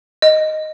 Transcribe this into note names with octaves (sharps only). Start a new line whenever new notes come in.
D#5